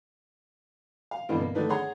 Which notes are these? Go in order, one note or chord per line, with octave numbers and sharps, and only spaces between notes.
F5
G2 B2 D3 E3 C4
A#3
D3 D#3 A3 D4 D#4 B4
G#4 C#5 F#5 A#5 C6